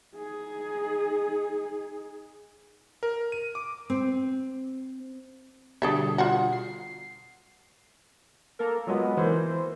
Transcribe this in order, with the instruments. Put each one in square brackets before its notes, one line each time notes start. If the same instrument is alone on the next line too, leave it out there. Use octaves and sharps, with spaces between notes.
[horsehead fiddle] D#4 G#4
[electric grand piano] A#4
D#7
D6
[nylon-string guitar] C4
[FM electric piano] B2 D3 G3 [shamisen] G#4 A4 E5
[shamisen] F4 F#4
[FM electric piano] C7
[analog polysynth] A#3 A4 A#4
[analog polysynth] F#3 G#3 B3 [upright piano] F4 F#4 D#5
[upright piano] E3 A#3 [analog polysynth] C5